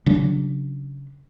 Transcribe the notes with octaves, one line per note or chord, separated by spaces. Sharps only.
C#3 F#3 D4